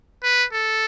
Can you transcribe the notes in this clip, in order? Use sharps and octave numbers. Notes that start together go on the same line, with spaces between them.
B4
A4